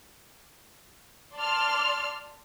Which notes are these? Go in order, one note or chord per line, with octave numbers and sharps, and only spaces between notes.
D5 A5 C6 F6